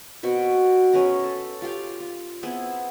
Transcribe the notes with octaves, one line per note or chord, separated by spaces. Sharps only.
B2 C4 F#4 B4
C#4 G#4 B4 A#5
A4
F4 G4 F5 G5
F4
B3 C4 E4 G#4